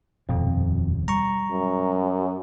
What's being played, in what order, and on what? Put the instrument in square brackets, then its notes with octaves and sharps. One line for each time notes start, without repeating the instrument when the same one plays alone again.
[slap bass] D#1 B2 [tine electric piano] F2
[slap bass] G3 [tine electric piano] A#5 C#6
[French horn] F#2